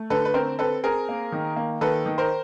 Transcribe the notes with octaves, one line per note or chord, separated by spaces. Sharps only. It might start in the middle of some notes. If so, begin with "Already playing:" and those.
Already playing: A3
D3 A4 B4
B4
C4 A#4 C5
C4 A4 B4
C4 G#4 A#4
A#3
D#3
A#3
D#3 A4 B4
D#3
A#4 C5